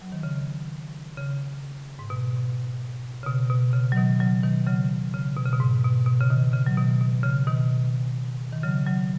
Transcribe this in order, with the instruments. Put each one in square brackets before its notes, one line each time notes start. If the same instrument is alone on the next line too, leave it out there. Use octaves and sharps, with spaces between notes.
[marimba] F#3
D#3
C#3
C#3
G#2
B2
C#3
B2
B2
C#3
F#3
B2 D#3
C#3 F#3
B2 D#3
C#3 F#3
C#3
B2
C#3
B2
G#2
B2
B2
C#3
B2 D#3
C#3
F#3
B2 D#3
B2
C#3
B2 D#3
D#3
C#3 F#3
C#3 F#3